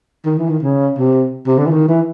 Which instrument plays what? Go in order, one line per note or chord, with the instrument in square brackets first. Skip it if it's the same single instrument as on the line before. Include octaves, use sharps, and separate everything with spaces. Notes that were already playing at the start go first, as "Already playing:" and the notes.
[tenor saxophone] D#3
E3
D#3
C#3
C3
C3
D3
E3
D#3
E3